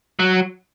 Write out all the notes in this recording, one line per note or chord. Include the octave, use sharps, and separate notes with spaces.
F#3